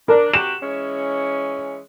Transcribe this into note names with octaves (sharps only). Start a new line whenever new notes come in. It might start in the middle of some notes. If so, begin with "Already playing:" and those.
D4 A#4 D5
C3 F#4 G4 E7
E3 G#3 C#4